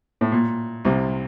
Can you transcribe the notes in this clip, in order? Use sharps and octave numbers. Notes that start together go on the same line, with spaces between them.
A2
A#2
C2 C3